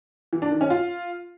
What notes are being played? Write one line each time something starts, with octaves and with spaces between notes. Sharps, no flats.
E3
D4
D#3
C#4
F4